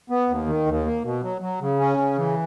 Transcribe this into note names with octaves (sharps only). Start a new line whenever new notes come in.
B3
D#2
D#3
D#2
A#3
B2
F#3
F#3
C#3
C#4
C#3
E3